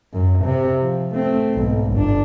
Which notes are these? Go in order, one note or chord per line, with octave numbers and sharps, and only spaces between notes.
F#2
C3
F3
A3 C4
B1 G#2
G1 D4